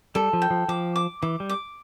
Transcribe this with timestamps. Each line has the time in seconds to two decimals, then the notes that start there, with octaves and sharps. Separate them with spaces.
0.15 G3 A4
0.33 F3
0.42 G5
0.51 F3
0.69 F3 D6
0.96 D6
1.22 E3 D6
1.40 G3
1.49 D6